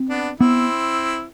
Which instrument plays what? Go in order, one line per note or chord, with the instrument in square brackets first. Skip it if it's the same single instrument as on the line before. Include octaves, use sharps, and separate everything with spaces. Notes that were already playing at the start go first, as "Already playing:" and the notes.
Already playing: [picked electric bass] C4
[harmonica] B3 D4
[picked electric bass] B3 [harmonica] C4 E4